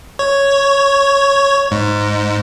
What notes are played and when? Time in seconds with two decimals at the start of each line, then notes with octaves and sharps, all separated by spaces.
0.19 C#5
1.71 G#2